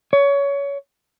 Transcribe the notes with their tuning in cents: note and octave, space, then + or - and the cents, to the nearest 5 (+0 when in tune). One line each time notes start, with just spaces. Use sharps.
C#5 +25